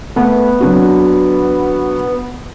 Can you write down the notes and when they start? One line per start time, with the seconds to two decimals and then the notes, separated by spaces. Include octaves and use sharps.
0.16 A3 B3
0.60 F#3 D4 F#4